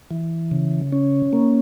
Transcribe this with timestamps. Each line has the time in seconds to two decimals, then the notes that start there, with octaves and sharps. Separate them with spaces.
0.11 E3
0.51 C#3
0.92 C#4
1.33 A#3